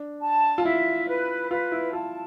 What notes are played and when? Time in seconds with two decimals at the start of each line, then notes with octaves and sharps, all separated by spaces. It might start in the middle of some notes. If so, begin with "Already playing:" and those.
Already playing: D4
0.22 A5
0.58 F4
0.64 E4 E5
1.08 B4
1.50 F4 B4
1.72 E4
1.93 F4 A5